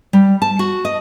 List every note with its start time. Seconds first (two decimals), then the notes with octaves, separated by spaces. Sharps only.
0.13 G3
0.42 A5
0.59 F#4
0.85 D#5